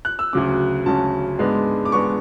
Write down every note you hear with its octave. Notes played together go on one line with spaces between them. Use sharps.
F#6
E6
D2 C#3 F#3 C#4 D6
D2 C#3 F#3 C#4 A5
G#2 G#3 B3 D4
D6
G#3 B3 D4 C#6